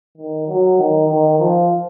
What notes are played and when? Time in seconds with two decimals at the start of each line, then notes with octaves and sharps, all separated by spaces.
0.18 D#3
0.48 F#3
0.78 D#3
1.09 D#3
1.39 F3